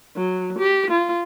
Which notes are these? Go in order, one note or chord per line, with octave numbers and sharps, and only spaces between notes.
F#3
G4
F4